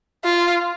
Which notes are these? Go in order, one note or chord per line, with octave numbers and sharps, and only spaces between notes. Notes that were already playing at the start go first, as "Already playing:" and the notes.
F4